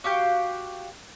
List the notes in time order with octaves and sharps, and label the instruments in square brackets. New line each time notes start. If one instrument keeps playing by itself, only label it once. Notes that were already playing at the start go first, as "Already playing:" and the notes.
[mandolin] F#4 G4 F5 G5